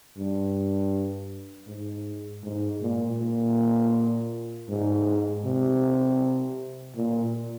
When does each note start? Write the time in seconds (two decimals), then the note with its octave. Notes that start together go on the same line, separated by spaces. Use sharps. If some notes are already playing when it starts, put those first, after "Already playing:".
0.17 G2
1.67 G#2
2.43 G#2
2.81 A#2
3.18 A#2
4.69 G#2
5.44 C3
6.96 A#2